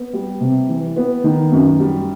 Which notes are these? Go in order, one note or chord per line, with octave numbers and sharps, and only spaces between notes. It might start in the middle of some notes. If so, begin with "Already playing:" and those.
Already playing: B3
G3
C3
E3
B3
D#3
F#2
G3